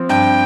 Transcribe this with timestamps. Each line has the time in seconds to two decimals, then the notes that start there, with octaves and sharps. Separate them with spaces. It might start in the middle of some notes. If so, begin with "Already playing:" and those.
Already playing: F3 C4
0.09 G2 G5